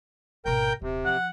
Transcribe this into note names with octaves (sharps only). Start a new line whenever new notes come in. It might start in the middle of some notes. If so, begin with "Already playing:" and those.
G#1 B2 A#4 G5 G6
D#1 C3
F3 F#5